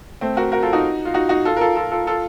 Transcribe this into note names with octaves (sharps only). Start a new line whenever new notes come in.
A3 C4
F#4 A#4
F#4 A#4
F4 A4
D#4 F#4
F4
D#4 F#4
D#4 F#4
F4 A4
A#4
F4 A4
F4 A4
F4 A4
F4 A4